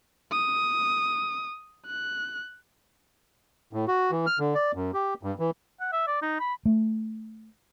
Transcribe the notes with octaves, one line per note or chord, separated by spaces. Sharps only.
D#6
F#6
A2
F#4
E3
F6
D3
D5
F#2
G4
G2
E3
F#5
E5
D5
D#4
B5
A3